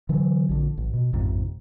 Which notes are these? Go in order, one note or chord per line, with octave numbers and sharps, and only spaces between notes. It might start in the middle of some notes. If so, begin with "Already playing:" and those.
D3 E3 F#3
A#1 D3
A1
B2
A1 F2 G#2 C3